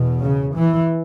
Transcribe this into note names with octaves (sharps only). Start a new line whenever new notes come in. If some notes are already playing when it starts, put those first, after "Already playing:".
Already playing: E2 B2
C#3
E3